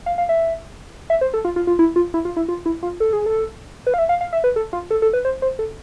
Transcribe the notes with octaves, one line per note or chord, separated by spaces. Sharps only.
F5
F5
E5
E5
C5
A4
F4
F4
F4
E4
F4
E4
F4
E4
F4
E4
F4
A4
G#4
A4
B4
F5
E5
F5
F5
E5
B4
A4
F4
A4
A4
B4
C5
C5
A4